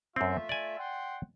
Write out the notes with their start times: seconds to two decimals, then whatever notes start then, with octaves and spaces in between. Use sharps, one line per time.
0.16 F#2 A3 C4 F4 E5
0.49 D5 G#5
0.78 F#5 G5 C6